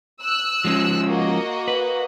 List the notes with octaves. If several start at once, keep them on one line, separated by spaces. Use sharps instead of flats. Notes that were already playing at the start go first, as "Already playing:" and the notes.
E6 F#6
F3 G#3 C#4
A#3 F#4 D#5
B4